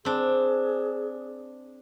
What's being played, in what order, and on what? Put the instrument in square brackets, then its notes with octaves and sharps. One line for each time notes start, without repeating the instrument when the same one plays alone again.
[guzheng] C4 D4 [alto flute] G#4